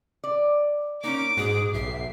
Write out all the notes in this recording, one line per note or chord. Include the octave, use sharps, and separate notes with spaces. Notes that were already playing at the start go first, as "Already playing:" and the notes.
D5
A#3 C#4 D#4 D6
G#2 F#4 G#4
B1 E5 C7